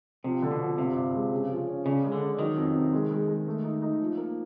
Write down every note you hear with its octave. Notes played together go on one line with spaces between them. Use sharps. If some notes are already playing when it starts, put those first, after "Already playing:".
C3 F3
D3
B2
F3
G2 C3
G2
G#3
C#3
F3
C#4
C#3 D4
G#3
D3
D4
D#3 F#3
F2
C3
G#3
G#3
G#3
A3
D#4
D#4
F3
A#3